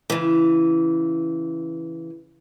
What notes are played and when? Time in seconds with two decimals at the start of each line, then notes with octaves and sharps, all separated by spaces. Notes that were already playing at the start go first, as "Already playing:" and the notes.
0.10 C#3 E3